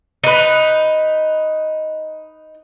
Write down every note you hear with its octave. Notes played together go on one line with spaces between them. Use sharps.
D#4 B4